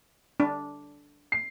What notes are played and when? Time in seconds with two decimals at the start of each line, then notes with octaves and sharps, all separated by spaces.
0.40 D4
1.32 C7